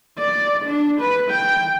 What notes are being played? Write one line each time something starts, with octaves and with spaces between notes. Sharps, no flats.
D5
D4
B4
G5